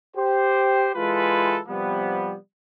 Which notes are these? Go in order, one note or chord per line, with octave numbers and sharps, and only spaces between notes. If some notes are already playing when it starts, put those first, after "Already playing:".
G4 C5
E3 G#3 F4 A4 B4
C3 F3 G3 B3